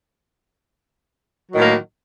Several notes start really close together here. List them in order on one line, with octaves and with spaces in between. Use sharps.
F#3 D#3 A2 A#3